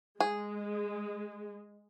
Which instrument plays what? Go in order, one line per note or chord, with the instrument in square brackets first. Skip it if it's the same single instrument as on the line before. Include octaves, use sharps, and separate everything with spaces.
[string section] G#3 [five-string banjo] G#4